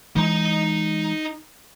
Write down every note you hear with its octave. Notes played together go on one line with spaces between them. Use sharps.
E3 G#3 D#4 A#5